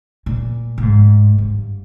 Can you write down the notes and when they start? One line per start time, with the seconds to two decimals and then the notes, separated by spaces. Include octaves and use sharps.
0.26 A#2
0.78 A#2
0.83 G#2
1.38 G2